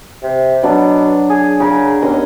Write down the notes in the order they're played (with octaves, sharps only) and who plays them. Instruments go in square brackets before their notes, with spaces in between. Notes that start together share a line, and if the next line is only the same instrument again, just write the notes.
[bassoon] C3
[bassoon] B2 [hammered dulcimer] F#3 D4
[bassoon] G#4
[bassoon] C#3 [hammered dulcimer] G#4 A#4
[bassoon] D#2 [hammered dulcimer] B3 C#4 D#5